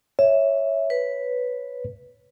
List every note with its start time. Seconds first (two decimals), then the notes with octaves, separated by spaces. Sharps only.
0.19 C#5 E5
0.90 B4